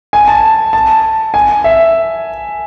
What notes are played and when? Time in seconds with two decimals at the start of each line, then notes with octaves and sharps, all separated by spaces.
0.13 G#5
0.28 A5
0.73 A5
1.34 G#5
1.64 E5